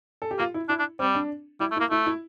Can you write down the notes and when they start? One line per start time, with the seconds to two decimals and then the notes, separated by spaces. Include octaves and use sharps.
0.22 A4
0.31 G4
0.39 A#3 F4
0.54 E4
0.69 D4 E4
0.79 D4
0.99 G3 C4
1.15 D4
1.60 G3 E4
1.71 A3
1.76 E4
1.80 A#3
1.91 A3 E4
2.06 E4